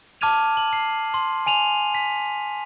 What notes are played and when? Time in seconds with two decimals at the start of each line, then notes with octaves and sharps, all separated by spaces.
0.21 A5 D6 F6 G#6 D#7 F7
0.57 F#7
0.73 C7
1.14 C6
1.46 G#5 D#7 F7 F#7
1.95 B6